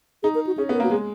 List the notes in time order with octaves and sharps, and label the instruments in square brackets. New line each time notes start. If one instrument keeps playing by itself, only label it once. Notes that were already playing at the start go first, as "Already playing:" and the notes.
[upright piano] D#4 [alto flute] G#4
[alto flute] A#4
F#4
[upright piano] C#4 [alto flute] G#4
[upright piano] B3 [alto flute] G#4
[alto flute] A#4
[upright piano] A#3
[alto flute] F#4
[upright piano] G#3 [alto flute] G#4